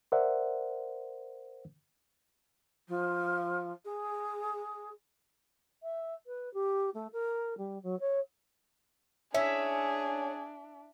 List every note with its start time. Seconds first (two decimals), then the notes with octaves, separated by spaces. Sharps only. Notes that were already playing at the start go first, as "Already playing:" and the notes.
0.12 A#4 C5 D5 E5 F#5
2.88 F3
3.85 G#4
5.83 E5
6.27 B4
6.54 G4
6.94 A3
7.13 A#4
7.58 G3
7.83 F#3
8.00 C#5
9.34 C#4 D4 G#4 E5